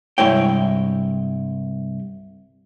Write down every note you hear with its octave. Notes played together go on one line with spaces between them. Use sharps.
C2 G2 G#3 E4 C#5 G5